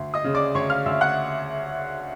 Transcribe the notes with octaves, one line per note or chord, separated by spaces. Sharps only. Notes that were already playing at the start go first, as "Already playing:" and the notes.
Already playing: D2
D#5 D#6
C#3
D5 D6
D2 C#5 C#6
F5 F6
D2 E5 E6
F#5 F#6